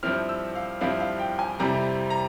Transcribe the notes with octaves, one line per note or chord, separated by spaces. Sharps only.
G2 F3 C4 E4 F6
E6
F5
G2 F3 C4 E4 F5
F5
G5
G#5
F2 C3 G3 C4 E4 A#5
A#5